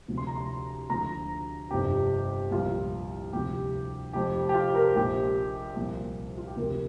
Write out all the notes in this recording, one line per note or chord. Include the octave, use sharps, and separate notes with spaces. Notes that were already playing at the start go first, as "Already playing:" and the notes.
D2 C3 F3
C6
A#5
C6
D2 D3 F3 A#5
G1 F2 C3 G4
C2 A#2 F3 F4
D2 C3 F3 G4
F1 F2 F3 G4
G4
F4
A#4
A#1 A#2 F3 G4
C2 A#2 F3
F4
G4
D2 C3 F3 A#4